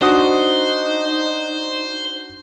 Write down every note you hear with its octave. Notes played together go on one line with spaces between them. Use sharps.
D4 D#4 F#4 C5 D#6